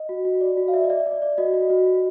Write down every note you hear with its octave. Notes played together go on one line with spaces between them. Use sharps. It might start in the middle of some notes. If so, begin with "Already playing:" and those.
Already playing: D#5
F#4
F#4
D5
F#4
F5
D5 E5
D#5
D5 E5
D5
D5
F#4 D#5
F#4
F#4
F#4